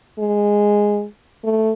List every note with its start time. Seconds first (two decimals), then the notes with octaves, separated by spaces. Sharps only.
0.19 G#3
1.44 A3